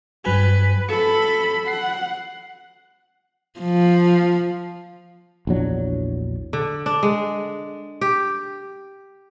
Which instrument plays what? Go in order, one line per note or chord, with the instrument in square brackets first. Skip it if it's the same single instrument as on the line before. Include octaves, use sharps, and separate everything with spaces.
[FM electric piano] G2 F#3 G#5 [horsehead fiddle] B4
[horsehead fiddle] A4 B5 [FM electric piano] C#7
[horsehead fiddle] F#5 [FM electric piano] C7
[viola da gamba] F3
[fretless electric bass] A#1 E2 F#3 D4
[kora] D3
D4
G#3
G4